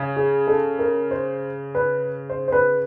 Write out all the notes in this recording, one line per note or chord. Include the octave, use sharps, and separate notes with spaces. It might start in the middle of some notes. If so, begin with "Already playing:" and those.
Already playing: C#3
G#4
A4
A#4
C5
B4
C5
C5
B4